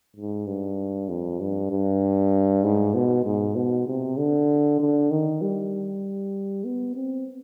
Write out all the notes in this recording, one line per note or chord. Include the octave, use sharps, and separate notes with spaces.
G#2
G2
F2
G2
G2
G#2
B2
G#2
B2
C3
D3
D3
D#3
G3
B3
C4